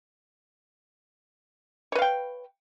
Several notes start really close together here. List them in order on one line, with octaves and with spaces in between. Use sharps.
C#5 B4 F5 G5